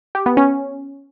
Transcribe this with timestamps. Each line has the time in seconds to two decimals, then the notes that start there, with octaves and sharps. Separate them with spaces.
0.15 G4
0.26 B3
0.37 C#4